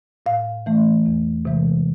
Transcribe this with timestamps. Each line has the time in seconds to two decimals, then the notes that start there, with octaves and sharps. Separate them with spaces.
0.26 A2 F5
0.66 E3 A3
1.06 E2
1.45 C3 E3 G#3